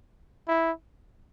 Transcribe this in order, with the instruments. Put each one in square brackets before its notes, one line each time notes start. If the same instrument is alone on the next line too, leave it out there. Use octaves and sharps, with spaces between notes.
[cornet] E4